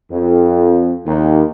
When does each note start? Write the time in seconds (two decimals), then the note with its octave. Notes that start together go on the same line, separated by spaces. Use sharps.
0.10 F2
1.06 D#2